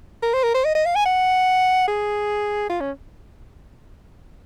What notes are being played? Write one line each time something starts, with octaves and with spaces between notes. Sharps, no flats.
A#4
C5
A#4
C5
D#5
D#5
F5
G#5
F#5
G#4
F4
C#4